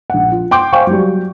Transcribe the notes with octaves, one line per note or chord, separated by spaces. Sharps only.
A#1 F#5
F4
G5 C6 D6 G6
C5 F5 G5 G#5 C#6
F#3 G3